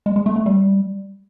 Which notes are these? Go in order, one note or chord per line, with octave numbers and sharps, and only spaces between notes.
G#3
G#3
A3
A3
G3